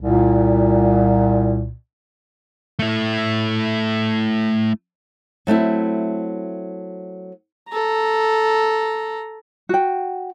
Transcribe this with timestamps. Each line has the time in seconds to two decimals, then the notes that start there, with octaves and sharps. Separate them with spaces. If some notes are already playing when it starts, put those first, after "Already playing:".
0.01 C2 A#2
2.79 A3 E4
5.47 F#3 A3 C4 E4
7.69 A4 A#5
9.69 F#4 G5